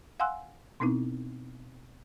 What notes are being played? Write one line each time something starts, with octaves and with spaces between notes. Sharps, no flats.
F5 F#5 G#5 C6 E6 F#6
B2 B3 C4 D#4 E4